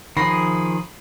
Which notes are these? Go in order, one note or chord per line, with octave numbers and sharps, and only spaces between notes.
D#3 F3 G#4 B5 A#6 C7